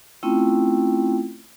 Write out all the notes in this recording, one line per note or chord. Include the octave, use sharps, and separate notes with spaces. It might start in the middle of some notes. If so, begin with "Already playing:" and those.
A3 C4 C#4 E4 F4 G5